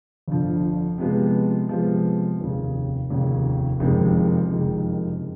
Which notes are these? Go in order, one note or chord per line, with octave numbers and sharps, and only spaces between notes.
G1 F2 D3 F3
C3 F3 G#3 B3
C3 F3 G#3 B3
F1 D#2 C#3
F1 D#2 C#3
F#1 F2 C3 D#3 G#3
F#1 F2 C3 D#3 G#3